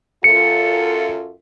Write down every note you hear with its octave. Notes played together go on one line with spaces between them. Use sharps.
F#2 F4 A4 C#7